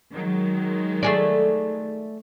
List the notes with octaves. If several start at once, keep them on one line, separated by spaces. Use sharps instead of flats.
D#3 F#3 G#3
A3 G#4 D5